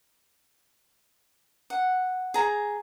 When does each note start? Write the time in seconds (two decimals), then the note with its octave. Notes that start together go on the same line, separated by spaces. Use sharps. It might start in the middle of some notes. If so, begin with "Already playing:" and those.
1.70 F#5
2.34 G#4 A#5